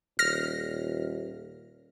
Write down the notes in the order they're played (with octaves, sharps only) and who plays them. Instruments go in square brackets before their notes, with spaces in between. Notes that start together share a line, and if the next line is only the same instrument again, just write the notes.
[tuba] D#1 [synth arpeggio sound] F6 A#6